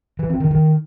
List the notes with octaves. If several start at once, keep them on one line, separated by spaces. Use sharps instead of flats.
E3
C4
D#3
D#3